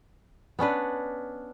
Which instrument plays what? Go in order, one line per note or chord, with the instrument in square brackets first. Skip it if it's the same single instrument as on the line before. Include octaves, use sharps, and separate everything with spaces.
[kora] B3 C#4 D4 B4